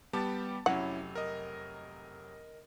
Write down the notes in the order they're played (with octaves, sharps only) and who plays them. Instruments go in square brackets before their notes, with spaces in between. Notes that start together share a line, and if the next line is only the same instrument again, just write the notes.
[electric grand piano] G3 B3 G4 [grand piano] A5 D6 A6
[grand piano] F1 F#3 [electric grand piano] C#4 E4 [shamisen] F#5
[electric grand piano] A#4 D#5